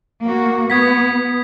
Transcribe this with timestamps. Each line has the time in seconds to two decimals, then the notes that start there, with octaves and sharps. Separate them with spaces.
0.24 A#3 F#4
0.70 B3 D#6 G#6 B6